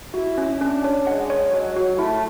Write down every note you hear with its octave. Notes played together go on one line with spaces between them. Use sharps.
E4 F#4
C#4
C#4 D4
C#5
G#3 F#5
C#5
F#3 C#5
F#4
A3 E4